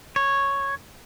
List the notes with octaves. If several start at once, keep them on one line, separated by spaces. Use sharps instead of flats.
C#5